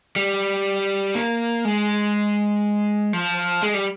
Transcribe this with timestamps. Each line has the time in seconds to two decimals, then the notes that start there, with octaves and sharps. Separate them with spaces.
0.16 G3
1.15 A#3
1.65 G#3
3.13 F3
3.63 G#3
3.74 G3